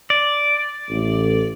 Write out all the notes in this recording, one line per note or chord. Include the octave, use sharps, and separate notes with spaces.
D5
A1